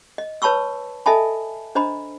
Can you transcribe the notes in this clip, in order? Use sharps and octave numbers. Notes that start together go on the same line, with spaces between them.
D#5
B4 C#5 A5 B5 C#6 E6
A4 D#5 E5 G#5 A5 B5
D4 C5 D#5 A#5 B5